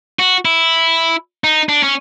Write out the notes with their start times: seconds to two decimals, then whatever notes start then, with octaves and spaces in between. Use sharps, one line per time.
0.19 F#4
0.45 E4
1.44 D#4
1.69 D4
1.83 C#4